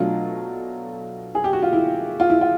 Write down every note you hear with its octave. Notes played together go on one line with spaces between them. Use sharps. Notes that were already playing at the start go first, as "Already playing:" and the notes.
Already playing: B2 F#3 A3 D4 F4
G#4
G4
F#4
F4
E4
F4
E4
F4